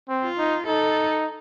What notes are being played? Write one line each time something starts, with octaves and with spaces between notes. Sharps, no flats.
C4
F4
D#4
D#4 A4